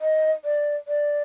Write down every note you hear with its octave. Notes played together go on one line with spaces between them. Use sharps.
D#5
D5
D5